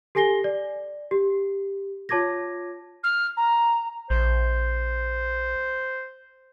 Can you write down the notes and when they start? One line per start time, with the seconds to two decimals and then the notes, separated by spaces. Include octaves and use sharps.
0.15 G4 A4 G#5 A#6 C7 G7
0.44 D5
1.11 G4
2.09 F4 C#5 A5 D6 G#6 A#6
3.03 F6
3.37 A#5
4.10 A#1 C5